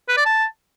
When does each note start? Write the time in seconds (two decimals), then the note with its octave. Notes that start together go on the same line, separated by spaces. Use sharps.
0.08 B4
0.17 D5
0.25 A5